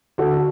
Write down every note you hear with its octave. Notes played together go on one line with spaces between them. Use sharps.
D3 F#4 A4